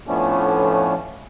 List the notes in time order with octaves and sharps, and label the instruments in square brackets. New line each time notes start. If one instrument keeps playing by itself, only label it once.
[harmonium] A2 F3 A3 B3 C#4 D4